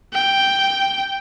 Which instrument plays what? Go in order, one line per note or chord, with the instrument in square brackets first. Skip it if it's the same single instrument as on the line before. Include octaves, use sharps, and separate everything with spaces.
[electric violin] G5